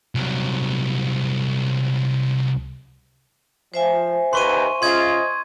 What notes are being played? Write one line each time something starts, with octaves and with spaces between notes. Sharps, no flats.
C2 F#3
F3 C5 E5 G#5
D#2 B4 C6 C#6 D#7
C#3 F4 D#5 C6 G#6